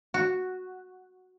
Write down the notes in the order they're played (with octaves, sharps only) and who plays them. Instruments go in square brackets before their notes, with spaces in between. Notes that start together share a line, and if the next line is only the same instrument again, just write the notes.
[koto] F#4